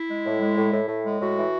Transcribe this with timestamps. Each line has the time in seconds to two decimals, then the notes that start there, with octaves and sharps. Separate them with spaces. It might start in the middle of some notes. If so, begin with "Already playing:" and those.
Already playing: E4
0.10 G#3
0.26 A2
0.41 G#3
0.58 A2
0.73 A2
0.89 A2
1.05 G#3
1.20 A2 F#4
1.37 E3